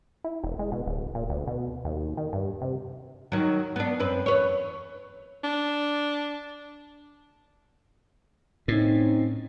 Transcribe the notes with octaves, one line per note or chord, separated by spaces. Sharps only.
E4
E1
G#3
B2
D1
A#2
D2
B2
D#2
D#3
G2
C3
D#3 F#3
B3 D4
F#2 C4 B4
E2 B4 C#5
D4
A2 C4 C#4 D#4